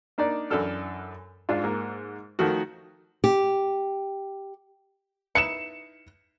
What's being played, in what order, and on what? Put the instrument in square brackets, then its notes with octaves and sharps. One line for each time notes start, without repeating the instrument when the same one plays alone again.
[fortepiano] A#3 D4 D#4 D5
F#2 E3 D4 A4 F6
G#2 D4 F4
G#2 A#3
D#3 F3 A3 F#4
[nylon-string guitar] G4
[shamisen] D#4 E4 B4 [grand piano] C#7 E7